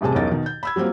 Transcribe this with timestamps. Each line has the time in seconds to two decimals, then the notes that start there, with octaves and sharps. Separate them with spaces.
0.01 D#1 A1 C3 G#4 A5
0.15 B1 E2 C#4 D#4 A#4 A6
0.31 B2 D#3
0.46 G6
0.63 B5 E6 G#6
0.76 F#3 G3 A#3 C4 F4